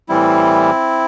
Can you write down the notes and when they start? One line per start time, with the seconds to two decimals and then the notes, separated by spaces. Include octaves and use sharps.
0.09 A2 E3 G3 C4 E4